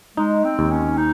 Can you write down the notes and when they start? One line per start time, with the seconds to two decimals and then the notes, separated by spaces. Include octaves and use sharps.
0.17 G#3 D#4
0.45 C4
0.59 D#2
0.71 C#4
0.98 D#4